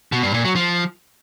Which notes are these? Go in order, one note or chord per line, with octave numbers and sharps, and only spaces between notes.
B2
G2
A#2
F#3
F3